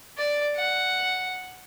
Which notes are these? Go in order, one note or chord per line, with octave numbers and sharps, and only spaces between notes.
D5
F#5